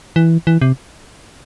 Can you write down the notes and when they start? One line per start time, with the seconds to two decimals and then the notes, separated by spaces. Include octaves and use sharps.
0.16 E3
0.47 E3
0.61 C3